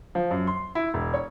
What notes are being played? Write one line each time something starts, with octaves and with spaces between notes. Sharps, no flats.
F3
F#2
C6
E4
E1
C#5